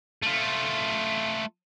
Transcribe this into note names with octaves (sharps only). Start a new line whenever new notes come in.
A3 F4